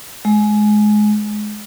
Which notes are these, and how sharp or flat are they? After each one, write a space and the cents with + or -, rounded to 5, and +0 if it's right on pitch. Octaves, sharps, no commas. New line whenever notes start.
G#3 +20